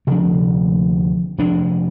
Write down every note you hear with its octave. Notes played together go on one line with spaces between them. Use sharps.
D2 C3 F3 D4
F1 F2 F3 D4